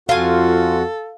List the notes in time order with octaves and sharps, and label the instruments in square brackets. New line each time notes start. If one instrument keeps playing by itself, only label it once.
[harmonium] F2 F#4 F#5 [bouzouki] F4 G#5 [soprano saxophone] A4 [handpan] F5